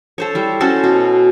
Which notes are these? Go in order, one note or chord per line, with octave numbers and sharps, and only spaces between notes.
A4 C5 C#5
G3 E4
C#4 F#4 A4 C5
B2